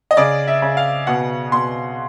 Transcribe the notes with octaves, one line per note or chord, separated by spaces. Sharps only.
D#5
C#3 D5
E5
C#3
F5
B2 F#5
B2 C6